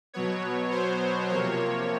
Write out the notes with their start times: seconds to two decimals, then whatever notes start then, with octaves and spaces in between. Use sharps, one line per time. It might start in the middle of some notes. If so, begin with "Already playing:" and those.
0.14 B2 F#3 B3 C#5
0.71 C5
1.29 C3 F3 A#3 C#5